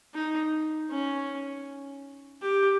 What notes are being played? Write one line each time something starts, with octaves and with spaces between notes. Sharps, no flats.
D#4
C#4
G4